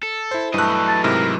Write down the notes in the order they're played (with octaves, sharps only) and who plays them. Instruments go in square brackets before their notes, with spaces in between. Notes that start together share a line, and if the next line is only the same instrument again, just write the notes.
[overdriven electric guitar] A4
[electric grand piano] E4 C5
[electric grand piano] G2 F#6 [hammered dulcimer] E3 A3 [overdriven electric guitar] F#3 D#5
[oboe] A5
[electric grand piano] G#2 C3 E4 [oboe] A#4